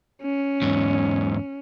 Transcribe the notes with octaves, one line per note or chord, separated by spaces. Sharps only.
C#4
E2 G#2